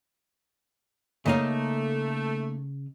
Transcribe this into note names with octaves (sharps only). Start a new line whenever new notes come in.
C#3 A3 A#3 D#4 D#5 F5